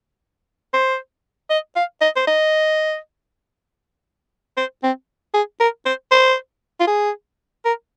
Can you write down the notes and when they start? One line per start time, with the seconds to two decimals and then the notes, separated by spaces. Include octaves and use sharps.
0.74 C5
1.50 D#5
1.76 F5
2.01 D#5
2.16 C5
2.27 D#5
4.57 C5
4.84 C4
5.34 G#4
5.60 A#4
5.86 C5
6.11 C5
6.80 F4
6.88 G#4
7.65 A#4